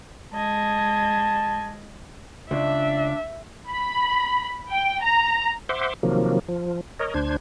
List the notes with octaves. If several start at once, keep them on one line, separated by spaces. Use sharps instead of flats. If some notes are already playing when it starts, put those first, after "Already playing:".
G#3 D#5 A5 G#6
C#2 D4 E5
B5
G5
A#5
C5 E5 F#5 C6 D6
C3 D#3 F3 F#3 A#3
F3
A#4 C#5 D#5
D2 D4 C5 G#6